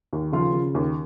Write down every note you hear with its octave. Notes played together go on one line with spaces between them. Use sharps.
D#2
C#3 F3 F4
C#3
D#2